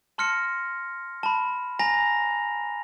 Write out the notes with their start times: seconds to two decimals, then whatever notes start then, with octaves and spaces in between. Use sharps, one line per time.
0.18 A5 C6 F6 A#6 C#7
1.23 A5 B5
1.79 G#5 A#5 A#6 F7